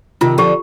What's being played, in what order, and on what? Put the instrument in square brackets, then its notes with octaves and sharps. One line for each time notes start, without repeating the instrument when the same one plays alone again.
[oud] C3 D#3 [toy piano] F4
[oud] D3 F3 [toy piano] G4